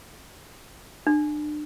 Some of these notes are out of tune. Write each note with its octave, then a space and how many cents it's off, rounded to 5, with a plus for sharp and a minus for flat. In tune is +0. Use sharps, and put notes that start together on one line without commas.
D4 +35